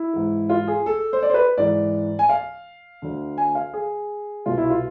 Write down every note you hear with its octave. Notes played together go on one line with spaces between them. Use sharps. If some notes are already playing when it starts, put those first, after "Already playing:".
Already playing: E4
G#2 E3
F4
G#4
A4
C5
D5
C5
B4
G#2 E3 D5
G#5
F5
D2 D3
G#5
F5
G#4
C2 B2 F4
E4
F4